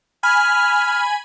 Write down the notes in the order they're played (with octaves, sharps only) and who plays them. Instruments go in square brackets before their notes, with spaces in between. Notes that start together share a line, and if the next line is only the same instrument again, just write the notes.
[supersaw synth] G#5 B5 [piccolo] F6